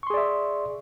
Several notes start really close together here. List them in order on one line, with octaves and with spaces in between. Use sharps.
C#6 C6 G#4 D5 E5